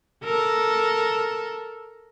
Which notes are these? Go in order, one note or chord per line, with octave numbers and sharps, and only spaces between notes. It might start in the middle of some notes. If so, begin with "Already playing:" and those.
A4 A#4